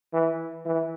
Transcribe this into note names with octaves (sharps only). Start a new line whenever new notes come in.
E3
E3